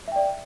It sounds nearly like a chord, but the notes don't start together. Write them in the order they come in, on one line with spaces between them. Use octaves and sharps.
E5 G5 D5